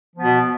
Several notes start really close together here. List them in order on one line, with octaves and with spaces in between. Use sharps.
F3 B3 B2